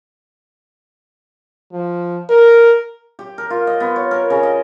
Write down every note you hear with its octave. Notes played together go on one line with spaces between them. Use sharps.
F3
A#4
G4
A#4
F4
D#5
B3
C#5
A#4
C#3
D#5